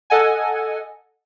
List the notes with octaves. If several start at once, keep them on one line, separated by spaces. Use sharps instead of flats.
A4 D#5 F#5 G#5